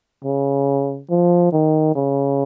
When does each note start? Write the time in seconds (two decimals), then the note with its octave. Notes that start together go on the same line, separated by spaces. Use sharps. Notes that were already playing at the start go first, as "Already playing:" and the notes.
0.24 C#3
1.10 F3
1.52 D#3
1.95 C#3